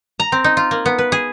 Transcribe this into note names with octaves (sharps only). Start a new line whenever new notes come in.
A#5
C4
D#4
F4
A#3
B3
B4
G#4